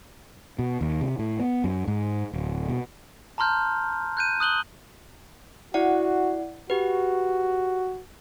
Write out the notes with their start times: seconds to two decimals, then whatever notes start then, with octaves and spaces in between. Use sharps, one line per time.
0.59 B2
0.81 D#2
1.01 C3
1.19 A2
1.39 B3
1.64 F#2
1.87 G#2
2.33 D1
2.69 B2
3.38 A5 A#5 C6 F6 G6
4.17 F#6 G6 D#7
4.40 D#6 F#6 F#7 G7
5.74 E4 F#4 D5 F#5
6.70 F#4 G4 B4